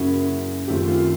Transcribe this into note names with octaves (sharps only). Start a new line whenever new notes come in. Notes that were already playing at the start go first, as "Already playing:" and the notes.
Already playing: F#2 C#3 F#3 A#3 C#4 E4 F#4
F#2 D#3 F#3 A3 C4 F4 G4
F4 G4